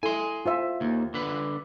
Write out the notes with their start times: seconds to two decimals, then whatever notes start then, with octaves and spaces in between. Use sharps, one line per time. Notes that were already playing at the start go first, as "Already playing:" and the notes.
0.03 E4 A4 G#5 C6
0.46 F4 C5 E5
0.81 D#2
1.14 D3 B4